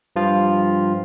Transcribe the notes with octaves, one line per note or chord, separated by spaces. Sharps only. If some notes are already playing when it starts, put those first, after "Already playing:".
G2 F3 F4